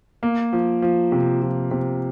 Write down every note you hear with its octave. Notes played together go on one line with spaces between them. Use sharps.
A#3
F3
F3
C3
F3
C3